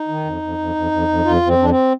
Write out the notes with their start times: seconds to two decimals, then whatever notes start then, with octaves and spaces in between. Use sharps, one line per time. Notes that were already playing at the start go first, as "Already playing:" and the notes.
Already playing: D#4
0.08 D#3
0.25 F2
0.42 F2
0.58 F2
0.75 F2
0.91 F2
1.08 F2
1.25 F2 F4
1.42 F2
1.47 C4
1.58 F2 D4
1.70 C4